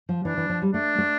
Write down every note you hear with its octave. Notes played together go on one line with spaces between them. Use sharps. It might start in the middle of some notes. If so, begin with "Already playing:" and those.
F3
E3 D4
E3
F3
G3
A3 D4
A3